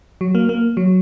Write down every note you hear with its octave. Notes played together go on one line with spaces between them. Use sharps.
F#3
A#3
A#3
F#3